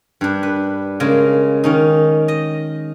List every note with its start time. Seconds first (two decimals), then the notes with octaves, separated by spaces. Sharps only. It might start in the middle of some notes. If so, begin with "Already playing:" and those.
0.21 G2 D4
0.43 B4
1.00 C#3 G#3 A#3
1.64 D#3 C#4 D#4
2.28 D#5